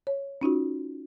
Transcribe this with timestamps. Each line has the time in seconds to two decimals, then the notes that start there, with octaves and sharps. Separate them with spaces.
0.07 C#5
0.41 C#4 D#4 F4 F#4